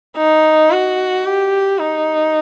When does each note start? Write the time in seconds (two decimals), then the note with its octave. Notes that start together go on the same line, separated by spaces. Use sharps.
0.17 D#4
0.71 F#4
1.25 G4
1.79 D#4